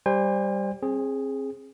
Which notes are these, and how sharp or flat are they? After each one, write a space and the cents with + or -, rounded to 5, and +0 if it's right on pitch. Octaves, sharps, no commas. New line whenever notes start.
G3 +0 C5 +0 G#5 -45
C4 +35 G#4 +0